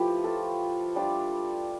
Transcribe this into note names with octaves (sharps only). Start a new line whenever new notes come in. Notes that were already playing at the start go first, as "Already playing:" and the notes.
Already playing: F3 A3 E4 G4 B4 A5
F4 A4
G3 D4 F4